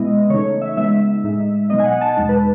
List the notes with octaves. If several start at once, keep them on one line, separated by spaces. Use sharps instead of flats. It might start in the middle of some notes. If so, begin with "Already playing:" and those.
Already playing: B2 G#3 B3 E4 D#5
C#3 E3 A3 D#4 C#5
E5
C#3 G#3 B3 D#4 E5
A2 G#3 D#4
B2 F#3 B3 D#4 D#5
G#5
F#5
A5
E2 B2 G#3 D#4 A5
B4